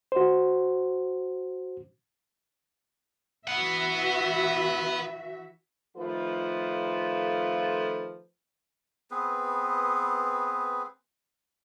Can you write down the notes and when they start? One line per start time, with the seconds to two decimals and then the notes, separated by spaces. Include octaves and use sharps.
0.12 F#4 C5
3.47 E3 F#4 B4 E5 F#5
5.97 D#3 F3 A3 F4 A4 B4
9.11 B3 C4 G#4 B4